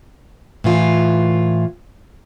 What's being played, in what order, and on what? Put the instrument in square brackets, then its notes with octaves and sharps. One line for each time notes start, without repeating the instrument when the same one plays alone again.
[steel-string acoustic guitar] A2 E3 F4